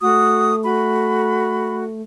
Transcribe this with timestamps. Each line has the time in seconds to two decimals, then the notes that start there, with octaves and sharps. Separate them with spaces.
0.01 A3 F#4 D#6
0.64 F#4 B5